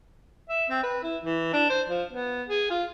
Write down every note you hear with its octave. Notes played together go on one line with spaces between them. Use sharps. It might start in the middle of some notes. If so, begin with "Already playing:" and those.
E5
C4
B4
E4
E3
D4
C5
F3
B3
G#4
F4